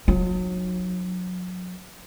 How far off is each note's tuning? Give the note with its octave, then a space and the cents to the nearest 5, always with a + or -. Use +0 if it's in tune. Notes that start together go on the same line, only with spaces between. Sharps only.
F#3 -30 D#4 -20